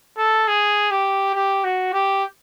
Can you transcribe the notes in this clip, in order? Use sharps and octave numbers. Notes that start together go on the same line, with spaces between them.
A4
G#4
G4
G4
F#4
G4